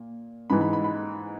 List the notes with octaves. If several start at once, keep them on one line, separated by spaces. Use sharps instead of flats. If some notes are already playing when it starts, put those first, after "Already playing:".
Already playing: A#2
G#2 E3 B5
B5
B5
B5